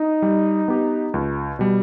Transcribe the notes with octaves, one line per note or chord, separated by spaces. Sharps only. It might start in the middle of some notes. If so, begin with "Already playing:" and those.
Already playing: D#4
G3
B3 G4
C#2
B2 G3